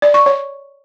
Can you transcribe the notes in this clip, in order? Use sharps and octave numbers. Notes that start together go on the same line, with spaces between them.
D5
C#6
C#5